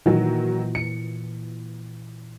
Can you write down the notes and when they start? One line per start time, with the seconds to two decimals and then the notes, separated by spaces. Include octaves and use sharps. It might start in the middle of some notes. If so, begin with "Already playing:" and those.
0.06 A#2 D#3 E3 F#3
0.75 C#7